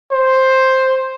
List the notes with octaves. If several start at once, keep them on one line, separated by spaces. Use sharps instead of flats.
C5